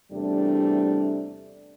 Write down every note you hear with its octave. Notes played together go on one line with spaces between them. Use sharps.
E2 C3 G3 A3 D4